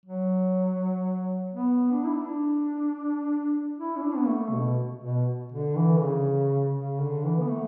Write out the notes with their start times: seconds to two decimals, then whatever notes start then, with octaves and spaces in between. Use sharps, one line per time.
0.05 F#3
1.54 B3
1.91 D4
2.04 E4
2.15 D4
3.78 E4
3.96 C#4
4.02 D4
4.16 B3
4.28 A3
4.49 C#3
4.53 B2
5.02 B2
5.52 D3
5.76 E3
6.01 C#3
6.76 C#3
7.00 D3
7.25 E3
7.40 B3
7.50 A3